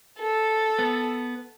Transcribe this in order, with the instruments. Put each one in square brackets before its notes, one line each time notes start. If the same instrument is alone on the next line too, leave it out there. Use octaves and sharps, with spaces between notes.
[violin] A4
[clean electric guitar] B3